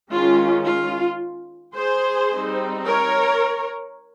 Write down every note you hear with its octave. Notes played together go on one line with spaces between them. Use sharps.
D#3 G#3 C#4 F4
F4
G#4 C5
G3 C4 D#4
A#4 C#5